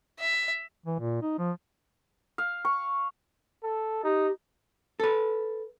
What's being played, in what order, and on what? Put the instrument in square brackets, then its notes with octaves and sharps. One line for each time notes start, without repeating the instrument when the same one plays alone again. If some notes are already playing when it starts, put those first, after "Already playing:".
[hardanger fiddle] E5
[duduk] E3
A#2
D#4
F3
[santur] F5
C#6
[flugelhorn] A4
[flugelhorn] D#4 [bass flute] G4
[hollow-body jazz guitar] A4 B4